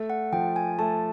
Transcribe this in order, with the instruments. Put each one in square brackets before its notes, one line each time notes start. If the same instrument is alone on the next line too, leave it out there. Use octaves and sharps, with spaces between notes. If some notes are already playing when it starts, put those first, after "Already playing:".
Already playing: [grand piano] A3
[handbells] F#5
[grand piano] F3 [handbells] G5
[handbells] G#5
[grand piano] A3 [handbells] A5